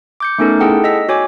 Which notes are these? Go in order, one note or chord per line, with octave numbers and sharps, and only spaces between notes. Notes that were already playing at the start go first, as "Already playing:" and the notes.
D6 G6 C#7
A3 B3 C#4 D#4 A4 A#4
E4 G#4 A4 F#5 G5 A5
D#5 E6 B6
F#4 C#5 G#5 D6